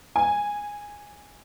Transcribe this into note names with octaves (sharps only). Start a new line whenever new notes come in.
G#5